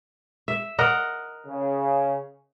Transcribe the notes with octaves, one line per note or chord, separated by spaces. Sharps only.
E5
A#4 D#5 F#5
C#3